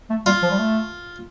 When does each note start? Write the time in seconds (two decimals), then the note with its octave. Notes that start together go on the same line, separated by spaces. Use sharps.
0.10 A3
0.26 G3 F4
0.42 F3
0.51 G3
0.58 A3